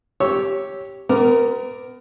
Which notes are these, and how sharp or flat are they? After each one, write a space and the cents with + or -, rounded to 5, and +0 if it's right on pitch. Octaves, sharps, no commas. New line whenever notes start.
G4 -5 C#5 +0 E6 -10
B3 +35 A#4 +0 D6 +0